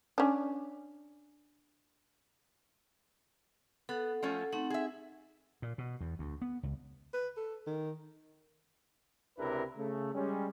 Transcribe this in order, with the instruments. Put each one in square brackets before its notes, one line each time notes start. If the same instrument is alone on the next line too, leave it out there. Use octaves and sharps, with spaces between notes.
[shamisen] C#4 D4
[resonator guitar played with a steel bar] B3 [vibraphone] A4 F#5
[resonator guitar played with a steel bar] F3 A3 C#4
[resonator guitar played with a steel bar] A3 [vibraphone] C4 D#4 F#5
[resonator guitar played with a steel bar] G#4 E5
[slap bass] A#2
B2
E2
D2
B3
C#2
[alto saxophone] B4
A4
D#3
[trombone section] C#2 C3 D4 E4 A#4 B4
C#3 A3
G3 G#3 C#4